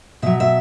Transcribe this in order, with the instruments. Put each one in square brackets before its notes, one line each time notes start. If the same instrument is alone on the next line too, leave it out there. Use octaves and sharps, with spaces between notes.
[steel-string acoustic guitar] B2 F#3 E5
E5